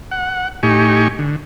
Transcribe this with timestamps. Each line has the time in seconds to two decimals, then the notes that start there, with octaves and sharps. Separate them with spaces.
0.11 F#5
0.63 A2 D#4 G4 G#5 C#6
1.19 D3